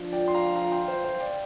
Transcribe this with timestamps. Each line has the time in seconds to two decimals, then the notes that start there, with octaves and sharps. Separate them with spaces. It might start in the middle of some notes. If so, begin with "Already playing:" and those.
Already playing: F3 D4 F4
0.13 D5 G5
0.28 C6
0.34 F5 A#5
0.56 F5 A#5
0.72 G5 C6
0.88 C5 F5
1.04 C5 F5
1.20 D5 G5